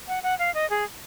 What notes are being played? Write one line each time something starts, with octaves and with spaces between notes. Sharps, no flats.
F#5
F#5
F5
D#5
G#4